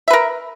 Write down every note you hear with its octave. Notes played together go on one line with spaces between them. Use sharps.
A#4 B4 E5